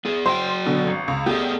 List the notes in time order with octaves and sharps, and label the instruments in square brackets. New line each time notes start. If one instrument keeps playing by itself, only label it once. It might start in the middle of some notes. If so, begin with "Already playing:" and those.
[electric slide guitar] B3 G#4
[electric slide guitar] F#3 F#5 G5 [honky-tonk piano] C5
[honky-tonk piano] B2 D3
G#1
C#2
[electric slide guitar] A3 B3 G#4 [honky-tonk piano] G4